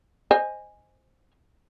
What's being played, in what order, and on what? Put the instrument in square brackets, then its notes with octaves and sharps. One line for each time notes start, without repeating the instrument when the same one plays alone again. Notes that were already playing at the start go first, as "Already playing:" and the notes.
[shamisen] C5 D#5 G#5